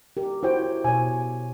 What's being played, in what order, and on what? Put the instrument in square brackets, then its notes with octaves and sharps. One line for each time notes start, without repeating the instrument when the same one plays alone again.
[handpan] G4 A#4
[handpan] E4 C5 C#5 [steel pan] F#4 G5
[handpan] B2 C#5 [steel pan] G#5